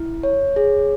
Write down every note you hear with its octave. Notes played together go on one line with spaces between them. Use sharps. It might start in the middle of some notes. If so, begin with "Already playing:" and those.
Already playing: E4
C#5
G#4